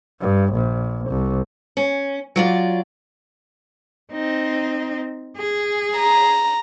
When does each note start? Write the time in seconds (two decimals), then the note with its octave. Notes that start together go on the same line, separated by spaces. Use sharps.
0.21 G2
0.53 A#1
1.09 C2
1.77 C#4
2.36 F#3 F4 D5
4.12 C4 D#4
5.37 G#4
5.97 A#5